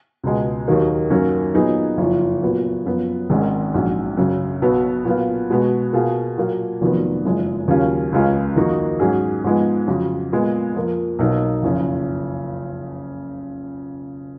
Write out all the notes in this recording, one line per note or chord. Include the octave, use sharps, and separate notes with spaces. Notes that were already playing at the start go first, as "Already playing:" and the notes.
C#2 B2 G#3
D#2 D#3 F#3 A#3 D#4
F#2 D#3 A#3 C#4 F#4
A#2 F#3 B3 D#4 G#4
F#1 F2 F3
A#2 F#3 B3
F#2 F3 B3
G#1 G#2 D#3 G#3 C#4
A#1 G#2 F#3 C#4
F#2 C#3 F#3
B1 B2 F#3 B3 F#4
A#2 F#3 B3 F4
B2 G#3 B3 F#4
B2 A#3 F4 G#4
A#2 F#3 A#3 F4
F1 F2 D#3 F#3 B3
F#1 F#2 F3 G#3
D#2 C#3 F#3 C#4 F4
C#2 C#3 G#3 C#4 F4
F2 D#3 A#3 D#4 F#4
G#2 F#3 C#4 G#4
G#2 F3 G#3 B3
F2 C#3 F#3
A#2 G#3 B3
F2 F3 A#3
B1 B2 A#3 D#4
F#1 F2 C#3 F3